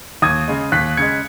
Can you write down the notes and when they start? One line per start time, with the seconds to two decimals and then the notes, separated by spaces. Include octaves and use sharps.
0.22 D#2 D#6 G#6
0.48 C#3 G#3
0.72 D#2 F#6 B6
0.97 C#3 G#3 G#6 C#7